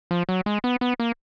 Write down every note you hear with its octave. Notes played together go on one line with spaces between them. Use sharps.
F3
F#3
G#3
B3
B3
A#3